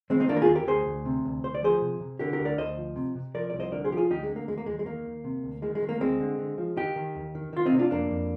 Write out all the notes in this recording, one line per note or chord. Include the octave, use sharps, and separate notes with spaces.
D#3 G#3 C4
C4 D#4
D#3 A#3 D4
A#4
F4 G#4
D#2
G4 A#4
D2 G#4 C5
D2
C3
D2
D2 C5
D5
F3 G#4 C5
C3
C3
D3 G4 A#4
G4 A#4
D2
A#4 D5
D2 C5 D#5
F3
C3
C3
F3 A#4 D5
C2 D5
C5 D#5
D3 A#4 D5
G#4 C5
F3 G4
F4 G#4
D2 D#4 G4
G#3
D3
A#3
D#2 G#3
A#3
D#2 G#3
G#3
D#3 A#3
D#2
C3
D2
D#3 G#3
G#3
D#3
A#3
D2 G#3 C4
D3
D3
F3
D#3 D#4 G4
D#3
D#2
D#3
D#3 F4
C4 D#4
C3
D4 F4
F2 A#3 D4
F2